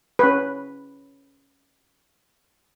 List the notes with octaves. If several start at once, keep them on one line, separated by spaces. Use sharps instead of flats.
C#4 B4